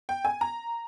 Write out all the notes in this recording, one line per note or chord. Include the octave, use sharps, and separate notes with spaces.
G5
G#5
A#5